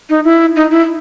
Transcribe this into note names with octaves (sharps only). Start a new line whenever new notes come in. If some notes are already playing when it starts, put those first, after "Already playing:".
D#4
E4
D#4
E4